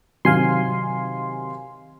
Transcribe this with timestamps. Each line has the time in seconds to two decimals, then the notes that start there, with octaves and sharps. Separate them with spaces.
0.25 C3 D#3 F#3 F5 G#5 C6